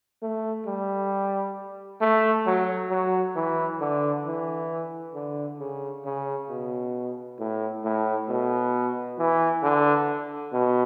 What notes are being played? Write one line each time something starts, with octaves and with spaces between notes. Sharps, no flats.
A3
G3
A3
F#3
F#3
E3
D3
E3
D3
C#3
C#3
B2
A2
A2
B2
E3
D3
B2